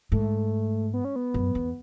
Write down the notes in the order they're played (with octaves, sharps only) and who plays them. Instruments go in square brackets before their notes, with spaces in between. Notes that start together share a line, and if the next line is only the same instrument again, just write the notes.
[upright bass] G#2 [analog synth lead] A3
[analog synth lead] B3
C#4
B3
[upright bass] F#2
E2